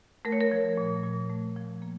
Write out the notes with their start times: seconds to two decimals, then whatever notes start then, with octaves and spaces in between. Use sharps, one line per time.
0.25 A3 A#4
0.32 C#5
0.40 A#4
0.51 F3
0.77 A#2
1.03 A#2
1.30 A3
1.56 F3
1.82 A#3